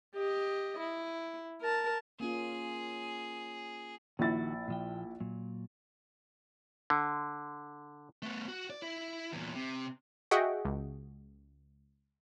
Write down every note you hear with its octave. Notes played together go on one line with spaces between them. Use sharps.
G4 D#5
E4
A#4 A5
A#3 C#4 F4 G#4
A#1 D#3 D#4 E4 F#4 A6
A#2 F3 G5
A#2 F#3
D3
A3 B3
F#4
D5
E4
E2 A#2
C3
F#4 G#4 D#5 E5 F#5 G5
C#2